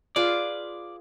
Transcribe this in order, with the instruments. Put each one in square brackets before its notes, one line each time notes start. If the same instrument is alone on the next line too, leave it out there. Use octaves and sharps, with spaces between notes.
[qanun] F4 G#4 B4 [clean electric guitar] D5